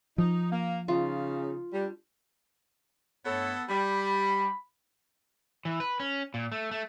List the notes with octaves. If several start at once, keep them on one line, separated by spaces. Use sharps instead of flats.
F3 D#4
A#3
C#3 D#4 F4
G3 D4
G2 A3 B3 A4 C#5
G3 B5
E3
B4
C#4
A#2
A3
A3